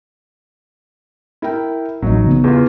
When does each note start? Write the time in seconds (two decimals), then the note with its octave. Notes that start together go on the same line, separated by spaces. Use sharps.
1.42 E4 A#4 G5
2.02 A1 F#3 D#4
2.26 C#3 B3
2.44 E2 E3 F4